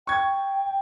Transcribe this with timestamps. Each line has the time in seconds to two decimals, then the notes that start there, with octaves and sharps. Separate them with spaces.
0.07 G5 C#6 G#6